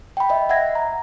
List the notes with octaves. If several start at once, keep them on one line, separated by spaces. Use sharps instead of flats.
G5 B5
D#5 E5 G5
E5 F#5 G#6 A#6
A#5